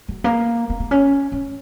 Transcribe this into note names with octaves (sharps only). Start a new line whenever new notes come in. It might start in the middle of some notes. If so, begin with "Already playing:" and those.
F#3
A#3
B3
B3
C#4
C#4